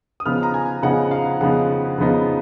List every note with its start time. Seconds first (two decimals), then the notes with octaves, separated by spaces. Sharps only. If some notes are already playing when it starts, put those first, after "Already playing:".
0.20 D#6
0.25 C#3 F3 B3 D#4 F6
0.43 A#5
0.54 G#5
0.83 C#3 F3 B3 D#4 F#5
1.11 F5
1.41 C#3 F3 B3 D#4 F#5
1.98 C#3 F3 B3 D#4